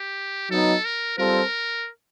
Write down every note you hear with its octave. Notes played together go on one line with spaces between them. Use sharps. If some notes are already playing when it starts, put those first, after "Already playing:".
Already playing: G4
F#3 B3 D#4 A4
A#4
G3 C4 F4 A4 A#4 C5